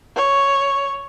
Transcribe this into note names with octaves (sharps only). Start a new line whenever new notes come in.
C#5